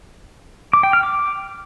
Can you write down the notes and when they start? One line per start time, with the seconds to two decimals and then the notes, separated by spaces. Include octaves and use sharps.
0.73 D6
0.83 G5
0.93 F6
1.03 D6